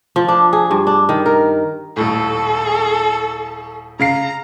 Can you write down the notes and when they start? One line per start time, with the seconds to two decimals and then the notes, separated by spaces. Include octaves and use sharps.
0.16 F3
0.28 D4
0.53 G#4
0.71 G2
0.87 D4
1.09 D#3
1.26 A#4
1.96 D#1 A2 A4
3.99 C#3 F5 A#5 C7